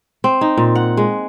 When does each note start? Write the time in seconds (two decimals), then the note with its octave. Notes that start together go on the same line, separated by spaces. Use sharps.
0.24 C4
0.41 D#4
0.57 A#2
0.75 F#5
0.97 G#3